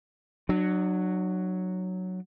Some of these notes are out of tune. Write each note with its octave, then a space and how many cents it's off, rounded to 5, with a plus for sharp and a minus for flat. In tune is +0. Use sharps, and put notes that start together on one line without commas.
F#3 +0 D4 +40